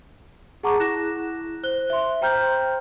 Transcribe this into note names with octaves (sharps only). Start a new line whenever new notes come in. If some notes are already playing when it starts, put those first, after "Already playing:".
G#4 F#5 A5 A#5 C#6 D6
E4 F#6 A#6 E7
C5 F#6 G7
E5 C6
C5 G5 A#5 F6 G6